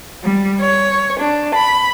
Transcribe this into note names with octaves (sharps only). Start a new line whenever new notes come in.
G3
C#5
D4
B5